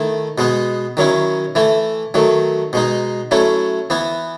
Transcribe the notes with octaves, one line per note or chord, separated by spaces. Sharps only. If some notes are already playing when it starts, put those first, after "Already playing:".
Already playing: D#3 A3 E4
B2 G#3 B3
D#3 F#3 C#4 E4
E3 A3 E4
D#3 F#3 A3
B2 G#3 D#4
F#3 A3 C#4 E4
E3 B3 E4